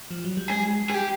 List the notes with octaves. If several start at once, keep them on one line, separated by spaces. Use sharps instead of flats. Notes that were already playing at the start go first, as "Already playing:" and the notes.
F3
F#3
G3
G#3 G#4
G#4
G4